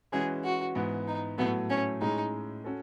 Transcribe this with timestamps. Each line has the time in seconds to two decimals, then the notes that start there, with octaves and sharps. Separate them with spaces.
0.12 E3 G#3 C#4 F#4 G#4
0.44 F#4
0.75 G#2 E3 B3
1.07 D#4
1.38 A2 F#3 A3 B3
1.70 C#4
2.01 A2 G#3 C#4 D#4 G#4
2.64 C#4 F#4 A4